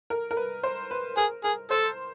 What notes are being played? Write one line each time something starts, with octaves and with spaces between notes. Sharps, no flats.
A#4
A#4
B4
C5
B4
G#4 A#4
G#4 A#4
A4 C5